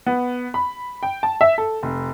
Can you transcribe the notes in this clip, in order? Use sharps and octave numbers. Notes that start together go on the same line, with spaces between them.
B3
B5
G5
A5
E5
A4
F1